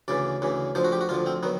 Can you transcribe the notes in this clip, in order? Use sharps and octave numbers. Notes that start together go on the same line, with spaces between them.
D2 C#3 E3 D5
D2 C#3 E3
D2 D3 F3 C5
F#4
G4
F#4
D2 D3 F3 F4
C4
D#3 F#3 B3